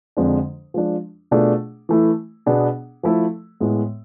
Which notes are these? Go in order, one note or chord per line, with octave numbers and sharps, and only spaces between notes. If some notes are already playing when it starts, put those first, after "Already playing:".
F2 D3 F3 G#3 D4
F3 G#3 D4 F4
B2 A3 D4 F4 G#4
E3 A3 E4
B2 B3 D4 G#4
F3 A3 E4 A4
A2 G#3 B3